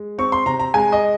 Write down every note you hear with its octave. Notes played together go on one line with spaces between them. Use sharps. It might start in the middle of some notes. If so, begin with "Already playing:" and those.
Already playing: G#3
C4 C#6
C6
C3 A#5
A#5
G#3 G#5
D#5